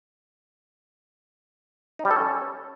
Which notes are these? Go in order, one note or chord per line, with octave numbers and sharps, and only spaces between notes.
D#4
G3
A4
C#4